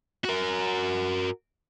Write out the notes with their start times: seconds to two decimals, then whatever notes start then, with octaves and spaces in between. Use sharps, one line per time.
0.25 F#4 A#4